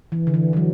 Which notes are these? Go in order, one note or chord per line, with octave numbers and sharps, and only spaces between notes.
E3
D3
E3
E3
F#3